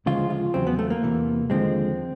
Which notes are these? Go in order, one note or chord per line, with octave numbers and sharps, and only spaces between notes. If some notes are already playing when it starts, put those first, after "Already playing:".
D2 C#3 F3 G#3 F4
F4
E2 C#3 F#3 C4
B3
A3
A#3
E2 C3 E3
D#2 D3 F3 G#3 C4